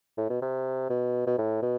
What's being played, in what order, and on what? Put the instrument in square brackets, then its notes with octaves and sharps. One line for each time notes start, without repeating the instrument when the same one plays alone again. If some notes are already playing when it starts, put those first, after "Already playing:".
[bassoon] A2
B2
C3
B2
B2
A2
B2